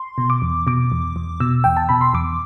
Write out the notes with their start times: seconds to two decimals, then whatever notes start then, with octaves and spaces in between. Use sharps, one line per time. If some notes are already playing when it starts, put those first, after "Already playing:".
Already playing: C6
0.18 B2
0.30 D6
0.42 E2
0.67 B2 D6
0.92 E2
1.16 E2
1.40 B2 E6
1.64 E2 G5
1.77 A5
1.89 B2 B5
2.01 C6
2.14 E2 D6